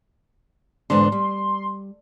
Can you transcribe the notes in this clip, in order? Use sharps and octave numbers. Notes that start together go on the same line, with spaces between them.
E2 G#2 D3 C6
G3